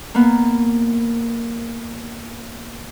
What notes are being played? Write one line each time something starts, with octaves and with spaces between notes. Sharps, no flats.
A#3 B3